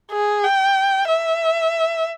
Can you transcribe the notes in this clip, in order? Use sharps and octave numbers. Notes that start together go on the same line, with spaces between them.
G#4
G5
E5